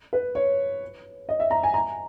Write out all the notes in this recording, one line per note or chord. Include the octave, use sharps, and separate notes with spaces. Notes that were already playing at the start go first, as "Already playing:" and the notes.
B4
C#5
D#5
E5
A#5
G#5
A#5